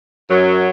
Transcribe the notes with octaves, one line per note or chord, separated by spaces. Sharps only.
F#2 F#3